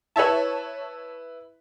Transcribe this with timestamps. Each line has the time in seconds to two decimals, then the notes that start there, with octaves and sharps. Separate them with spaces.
0.16 E4 B4 C#5 E5 A5